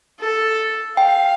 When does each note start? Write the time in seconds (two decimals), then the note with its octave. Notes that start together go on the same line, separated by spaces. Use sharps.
0.20 A4
0.97 F5 G5